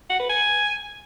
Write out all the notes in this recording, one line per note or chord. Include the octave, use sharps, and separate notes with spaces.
F#5
B4
G#5